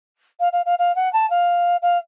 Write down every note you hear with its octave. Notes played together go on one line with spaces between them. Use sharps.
F5
F5
F5
F5
F#5
A5
F5
F5